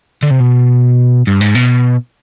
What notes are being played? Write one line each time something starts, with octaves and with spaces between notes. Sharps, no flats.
D3
C3
B2
G2
G#2
B2